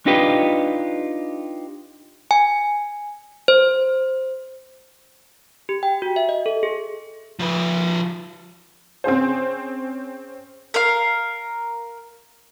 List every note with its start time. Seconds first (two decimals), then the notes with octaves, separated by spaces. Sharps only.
0.06 D4 D#4 F4 G4 B4 D#5
2.31 G#5
3.48 C5
5.69 G4
5.83 G5
6.02 F#4
6.16 E5
6.29 D#5
6.46 A4
6.63 G#4
7.40 F3 B4
9.04 C4 C#4 G#4 C5
10.74 A#4 F5